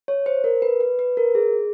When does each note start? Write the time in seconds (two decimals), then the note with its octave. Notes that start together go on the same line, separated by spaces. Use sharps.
0.08 C#5
0.26 C5
0.44 A#4
0.62 B4
0.80 B4
0.99 B4
1.17 A#4
1.35 G#4